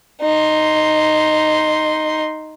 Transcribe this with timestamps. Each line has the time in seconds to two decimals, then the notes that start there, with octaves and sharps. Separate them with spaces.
0.21 D#4 C6